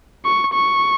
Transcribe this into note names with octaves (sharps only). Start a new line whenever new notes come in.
C#6
C#6